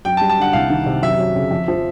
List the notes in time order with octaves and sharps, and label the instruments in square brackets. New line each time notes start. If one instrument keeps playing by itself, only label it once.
[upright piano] F#2 [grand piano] G5
[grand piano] A5
[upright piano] G3
[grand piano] A5
[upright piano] D3 [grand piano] F#5
[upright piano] C2 [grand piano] F5
[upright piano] D#3
C3
[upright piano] F#2 [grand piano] E5
[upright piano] F#3
C#3
F2
F3